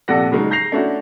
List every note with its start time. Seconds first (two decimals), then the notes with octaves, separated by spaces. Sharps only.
0.08 A#1 C3 A4 D5 F#5 A#6
0.32 C#3 F#3 G#3 D#4
0.50 A#5 G6 A#6 C7 F7
0.72 A3 C#4 D4 E4 F#4